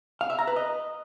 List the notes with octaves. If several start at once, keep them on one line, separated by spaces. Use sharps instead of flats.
F5
E5
A#5
B4
D#5